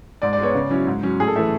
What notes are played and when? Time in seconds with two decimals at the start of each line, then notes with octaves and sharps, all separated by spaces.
0.22 G#2 D5
0.33 D5
0.38 G#3 B3 C#5
0.55 C#3
0.70 F#3 C#4 E4
0.87 G#2
1.03 F#3 C#4
1.20 A2 G#4
1.28 A4
1.35 E3 A3 E5